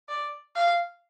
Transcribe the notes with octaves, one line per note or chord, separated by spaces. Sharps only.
D5
F5